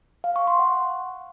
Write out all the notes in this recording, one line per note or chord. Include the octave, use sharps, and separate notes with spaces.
F5
C#6
C6
F#5